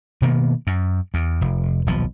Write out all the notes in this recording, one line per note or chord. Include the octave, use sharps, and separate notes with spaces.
B2 D#3 A#3 B3
F#2
E2
F1
D#1 B1 F3